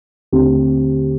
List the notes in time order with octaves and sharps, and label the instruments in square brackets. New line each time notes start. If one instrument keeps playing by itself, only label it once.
[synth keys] D#2 D3 A3 C4 G4